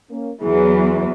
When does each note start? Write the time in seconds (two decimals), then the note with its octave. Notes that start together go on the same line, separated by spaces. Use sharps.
0.10 A#3 C#4
0.41 E2 E3 F#3 G#4